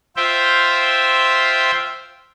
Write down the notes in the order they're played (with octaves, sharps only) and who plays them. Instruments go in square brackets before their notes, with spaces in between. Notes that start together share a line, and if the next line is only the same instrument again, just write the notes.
[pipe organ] F4 C5 E5 G5